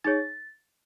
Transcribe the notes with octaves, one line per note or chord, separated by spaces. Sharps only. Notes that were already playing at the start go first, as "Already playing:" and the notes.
D#4 G#4 C#5 A6